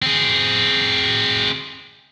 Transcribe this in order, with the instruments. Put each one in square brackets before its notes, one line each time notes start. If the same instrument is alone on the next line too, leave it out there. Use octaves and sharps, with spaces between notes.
[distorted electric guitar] C4 G#4